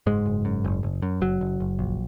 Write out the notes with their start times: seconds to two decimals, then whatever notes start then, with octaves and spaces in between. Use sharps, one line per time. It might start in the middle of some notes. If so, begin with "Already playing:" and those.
0.07 F#1 G#2 G#3
0.26 F#1
0.45 F#2
0.64 F#1
0.83 F#1
1.02 F#2
1.21 F#1 F#3
1.41 F#1
1.60 F#1
1.79 A#1